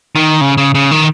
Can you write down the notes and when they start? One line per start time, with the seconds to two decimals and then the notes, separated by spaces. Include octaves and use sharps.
0.16 D#3
0.41 C#3
0.58 C#3
0.75 C#3
0.91 D#3